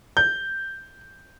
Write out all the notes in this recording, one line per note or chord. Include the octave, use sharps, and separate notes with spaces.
G6